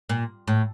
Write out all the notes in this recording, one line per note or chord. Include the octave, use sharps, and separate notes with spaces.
A#2
A2